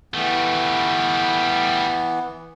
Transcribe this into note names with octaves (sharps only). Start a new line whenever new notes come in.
E3 G3 A3 B3